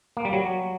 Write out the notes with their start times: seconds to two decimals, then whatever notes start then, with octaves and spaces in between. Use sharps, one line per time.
0.17 A#3
0.25 G3
0.33 F#3